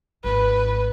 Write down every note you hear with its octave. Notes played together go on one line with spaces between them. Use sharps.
G#1 B4